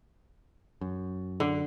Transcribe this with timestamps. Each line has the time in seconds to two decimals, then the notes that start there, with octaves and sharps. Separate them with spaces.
0.81 F#2
1.40 D3